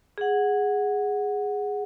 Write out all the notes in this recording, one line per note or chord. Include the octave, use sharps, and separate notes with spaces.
G#4 F#5